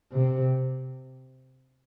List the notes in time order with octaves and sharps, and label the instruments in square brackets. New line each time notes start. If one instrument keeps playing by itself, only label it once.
[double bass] C3